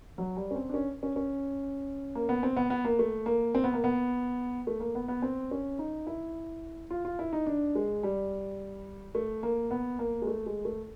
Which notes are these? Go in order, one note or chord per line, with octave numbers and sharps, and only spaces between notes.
F#3
G3
C#4
C4
D4
C#4
C#4
C#4
A#3
B3
C4
B3
B3
A#3
A3
A#3
C4
B3
A#3
B3
A3
A#3
B3
B3
C4
C#4
D#4
E4
F4
F4
E4
D#4
D4
G#3
G3
A3
A#3
B3
A#3
G#3
A3
G#3
A3